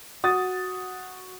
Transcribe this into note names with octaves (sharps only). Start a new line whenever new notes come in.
F#4 D#6 A6